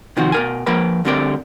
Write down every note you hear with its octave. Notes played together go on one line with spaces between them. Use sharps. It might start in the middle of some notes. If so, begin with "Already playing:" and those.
C3 D#3 F3 C4 F#4
B2 A#4 G#5
F3 A#3 A#4 B4 B5
D2 D3 G3 C4 A#4 D5